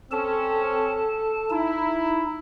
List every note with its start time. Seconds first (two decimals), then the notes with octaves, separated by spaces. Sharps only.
0.11 C4 C#4 A4 A5
1.50 D#4 E4